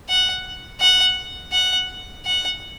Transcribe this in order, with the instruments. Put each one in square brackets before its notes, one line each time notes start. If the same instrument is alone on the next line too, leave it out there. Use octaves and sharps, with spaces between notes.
[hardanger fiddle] F#5
F#5
F#5
F#5